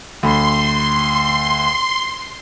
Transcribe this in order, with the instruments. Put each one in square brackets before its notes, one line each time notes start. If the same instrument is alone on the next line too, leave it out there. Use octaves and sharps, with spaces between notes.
[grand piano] D2 B5 [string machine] C6